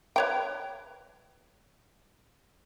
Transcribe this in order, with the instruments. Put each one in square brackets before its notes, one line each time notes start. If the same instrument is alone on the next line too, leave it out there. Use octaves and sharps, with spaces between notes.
[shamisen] B4 C#5 G5